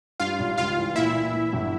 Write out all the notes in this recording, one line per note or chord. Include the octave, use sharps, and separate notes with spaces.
G2 F4 F5
G#1
C#2 F4 F5
E3
A#2 E4 E5
A#2
E3
G1